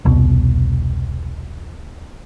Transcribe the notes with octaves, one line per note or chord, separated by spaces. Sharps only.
E1 C2 B2